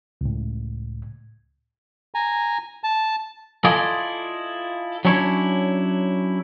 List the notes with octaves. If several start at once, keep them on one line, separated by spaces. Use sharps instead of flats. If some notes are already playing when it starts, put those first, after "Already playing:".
C#2 A2
G#5 A#5
A5
E4 F4 A4 D5 D#5 G#5
F#3 C#4 D4 E4 C#5